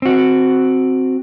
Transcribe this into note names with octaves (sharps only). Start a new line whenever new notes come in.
C4 F#4